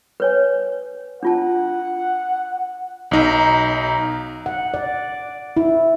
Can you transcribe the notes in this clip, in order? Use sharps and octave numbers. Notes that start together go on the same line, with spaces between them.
B4 C#5 G#5
D4 F4 F#5 A5
B1 D#4 A#5
F#5
D5
E4